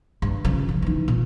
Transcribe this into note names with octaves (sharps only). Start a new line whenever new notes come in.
G2
C#3 F3
C#3
E3 D#4
A#2